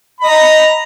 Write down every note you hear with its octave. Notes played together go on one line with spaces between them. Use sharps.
D#5 A#5 B5